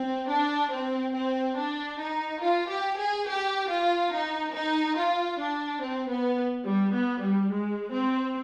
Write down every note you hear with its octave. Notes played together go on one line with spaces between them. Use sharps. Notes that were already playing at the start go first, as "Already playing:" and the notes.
Already playing: C4
D4
C4
C4
D4
D#4
F4
G4
G#4
G4
F4
D#4
D#4
F4
D4
C4
B3
G3
B3
G3
G#3
C4